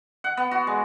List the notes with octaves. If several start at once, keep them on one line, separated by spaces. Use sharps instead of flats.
F#5
B3
F#4
G#3